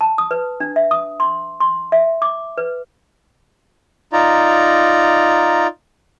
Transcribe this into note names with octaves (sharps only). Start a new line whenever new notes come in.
A5
D#6
B4
D4
E5
D#6
C6
C6
E5
D6
B4
D#4 F4 D5 A#5